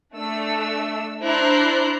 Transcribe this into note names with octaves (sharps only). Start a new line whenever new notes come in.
A3 D4 E6
D4 E4 C5 A#5 F#6 C7